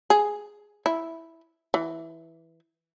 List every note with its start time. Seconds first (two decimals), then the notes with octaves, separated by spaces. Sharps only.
0.10 G#4
0.86 E4
1.74 E3